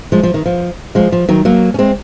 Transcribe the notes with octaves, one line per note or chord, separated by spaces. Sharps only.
F3 G#3
F3
D#3
F3
F3 G#3
F3
D#3 F#3
F#3 A#3
C#4
G#3 C4